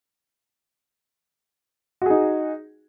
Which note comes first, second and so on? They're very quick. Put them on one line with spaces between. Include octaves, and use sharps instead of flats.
F#4 G#4 D#4